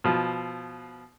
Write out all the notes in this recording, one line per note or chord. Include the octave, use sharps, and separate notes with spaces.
B2 F3